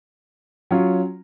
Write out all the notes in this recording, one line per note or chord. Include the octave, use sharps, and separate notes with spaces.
F#3 C#4 F4